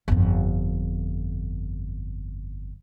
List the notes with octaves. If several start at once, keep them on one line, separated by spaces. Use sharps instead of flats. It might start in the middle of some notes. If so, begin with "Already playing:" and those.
G1 F2